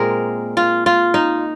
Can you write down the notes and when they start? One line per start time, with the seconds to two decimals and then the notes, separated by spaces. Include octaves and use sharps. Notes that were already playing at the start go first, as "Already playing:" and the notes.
Already playing: A#2 G#3 C4 G#4 A#4
0.57 F4
0.86 F4
1.14 D#4